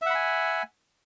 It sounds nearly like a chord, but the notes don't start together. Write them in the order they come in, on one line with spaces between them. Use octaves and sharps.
E5 F#5 B5 G#5